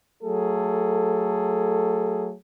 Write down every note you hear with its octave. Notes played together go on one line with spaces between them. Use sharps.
F#3 A3 G#4 A4